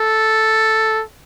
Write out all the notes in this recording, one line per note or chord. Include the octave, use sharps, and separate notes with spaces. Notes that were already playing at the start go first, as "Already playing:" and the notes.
Already playing: A4